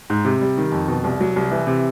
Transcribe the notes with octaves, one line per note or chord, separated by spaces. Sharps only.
G#2
C3
G3
D#3
F2
B2
C2
F#3
C2
E3
C3